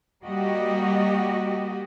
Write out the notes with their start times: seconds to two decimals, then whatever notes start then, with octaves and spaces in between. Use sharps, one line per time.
0.24 G3 A#3 F#4 G4 D#5